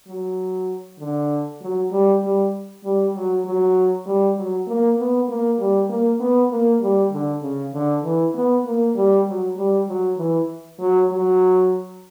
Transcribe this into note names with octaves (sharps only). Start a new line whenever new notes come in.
F#3
D3
F#3
G3
G3
G3
F#3
F#3
G3
F#3
A#3
B3
A#3
G3
A#3
B3
A#3
G3
D3
C#3
D3
E3
B3
A#3
G3
F#3
G3
F#3
E3
F#3
F#3